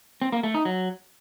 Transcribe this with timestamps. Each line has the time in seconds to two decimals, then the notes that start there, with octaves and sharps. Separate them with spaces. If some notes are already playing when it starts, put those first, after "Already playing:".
0.22 C4
0.32 A#3
0.43 A3
0.54 D#4
0.65 F#3